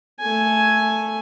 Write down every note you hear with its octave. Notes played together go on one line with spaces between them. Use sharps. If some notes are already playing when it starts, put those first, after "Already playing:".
A3 G#5